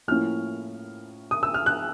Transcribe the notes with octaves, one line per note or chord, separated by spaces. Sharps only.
A2 F3 A#3 C#4 E4 F6
D#6
E6
F6
F#6